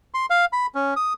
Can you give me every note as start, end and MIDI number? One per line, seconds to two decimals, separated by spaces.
0.14 0.26 84
0.30 0.45 77
0.53 0.66 83
0.75 0.94 61
0.96 1.13 87